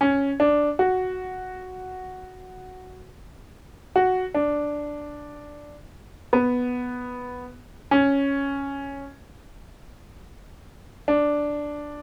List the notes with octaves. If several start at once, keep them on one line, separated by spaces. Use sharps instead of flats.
C#4
D4
F#4
F#4
D4
B3
C#4
D4